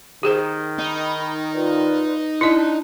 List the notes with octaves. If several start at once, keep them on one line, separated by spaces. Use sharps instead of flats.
D#3 G4 G#4 C5
D#4 B5
F4 B4 D5
D4 E4 D#5 A5 F#6